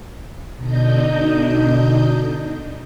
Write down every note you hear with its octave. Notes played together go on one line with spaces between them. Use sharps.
B2 D3 D4 D#4 D#5 G6